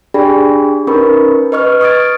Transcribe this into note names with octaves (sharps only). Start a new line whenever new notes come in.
D4 G4 G#4 D5 G5 B5
C#4 D#4 A#4 B4 B5 C#6
B4 D#5 C#6 F6
C#6 D#6 F6 G#6 A6 D7